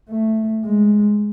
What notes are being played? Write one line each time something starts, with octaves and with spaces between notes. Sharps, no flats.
A3
G#3